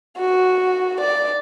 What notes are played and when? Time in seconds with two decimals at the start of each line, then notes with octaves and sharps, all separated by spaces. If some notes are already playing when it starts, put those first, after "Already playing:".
0.17 F#4
1.01 D5